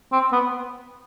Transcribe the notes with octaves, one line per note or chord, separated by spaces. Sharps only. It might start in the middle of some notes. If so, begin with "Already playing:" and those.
C4
B3